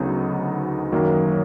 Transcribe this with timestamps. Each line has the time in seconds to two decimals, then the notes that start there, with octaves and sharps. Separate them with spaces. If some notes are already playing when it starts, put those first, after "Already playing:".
Already playing: D2 C#3 F#3 B3 D#4
0.92 F#2 D#3 F#3 A#3